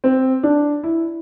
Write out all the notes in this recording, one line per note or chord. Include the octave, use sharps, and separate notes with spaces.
C4
D4
E4